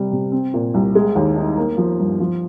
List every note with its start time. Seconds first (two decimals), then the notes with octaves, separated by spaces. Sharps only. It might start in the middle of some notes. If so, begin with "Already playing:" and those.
Already playing: C3 G3
0.12 C3
0.32 C4
0.54 A#2
0.74 C2
0.95 G#3
1.15 D#2
1.36 D#4
1.57 A#3
1.78 F3
1.99 G2
2.20 F3